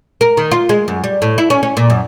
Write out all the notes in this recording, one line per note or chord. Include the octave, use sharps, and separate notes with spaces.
A#4
D#3
F4
G#3
F#2
G3
A2
E4
C#4
C#4
A#2
F#2